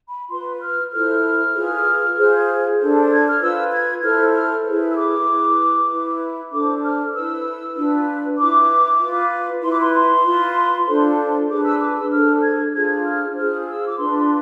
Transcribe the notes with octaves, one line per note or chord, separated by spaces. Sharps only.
B5
F4 B4 C6
F6
E4 A4 C5 F6
F4 G#4 B4
F4 G#4 C5
D4 A4 C5
G#6
F6
F4 B4 E6
G#6
E4 A4 C5 F6
F6
E4 G#4 B4
E6
D6
E4 B4
E4 B4
D4 A4 C5 D6
F6
E4 B4 E6
D4 F4 B4
E4 B4 D6
F4 B4
E4 B4 C6
D6
C6
C6
F4 B4
D4 F4 A4 C5
D4 G#4 B4 D6
E6
D6
E6
D4 A4 C5 F6
G#6
D4 F4 G#4 C5 G#6
F6
F4 G#4 C5 F6
E6
D6
D4 F4 B4 C6
C6